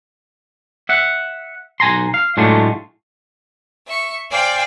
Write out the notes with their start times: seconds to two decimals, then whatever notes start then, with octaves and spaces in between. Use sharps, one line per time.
0.89 E5 F#5
1.80 B1 G#5 A#5 C6
2.14 F5
2.37 A2 F#3 G#3 A3 D4 F4
3.85 E5 C#6
4.30 C5 D5 F5 G5 G#5